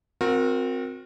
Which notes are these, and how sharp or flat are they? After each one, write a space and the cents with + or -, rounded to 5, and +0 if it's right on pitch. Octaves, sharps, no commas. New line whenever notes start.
C4 +0 F#4 -35 A#4 +0